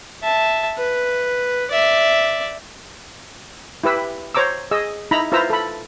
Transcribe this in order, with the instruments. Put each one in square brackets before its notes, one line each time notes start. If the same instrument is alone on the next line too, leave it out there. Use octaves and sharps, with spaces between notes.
[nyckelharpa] E5 A5
B4
D5 E5
[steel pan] E4 G4 B4 E6
C5 C#5 A#5 D6 E6
G#4 D#5 E6
D#4 E4 A#5 B5
E4 F4 B4 C5 A#5 E6
A4 B5